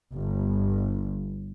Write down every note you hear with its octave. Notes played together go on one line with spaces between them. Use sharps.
G1